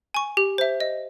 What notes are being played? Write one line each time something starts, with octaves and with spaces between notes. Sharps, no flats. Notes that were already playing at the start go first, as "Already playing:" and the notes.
G#5 C#6
G4
C5 E5
D#5